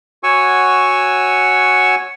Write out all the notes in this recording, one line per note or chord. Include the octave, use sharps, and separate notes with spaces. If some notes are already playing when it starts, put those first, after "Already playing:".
F#4 C#5 F#5 G#5 C#6 E6